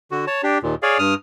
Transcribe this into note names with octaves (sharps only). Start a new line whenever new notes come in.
D3 F#4
C#5 A5
D4 G4
D#2 A#2
G#4 C#5 D5 F5
G2 D#6 F6